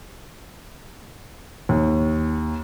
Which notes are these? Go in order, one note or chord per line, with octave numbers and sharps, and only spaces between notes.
D#2